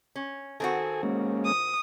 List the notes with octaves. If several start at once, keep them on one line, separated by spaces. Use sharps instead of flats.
C#4
D#3 C4 F#4 A4 G#5
G#3 A#3 C#4
D#6